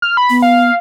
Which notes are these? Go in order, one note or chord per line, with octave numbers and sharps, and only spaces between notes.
F6
B5
B3
F5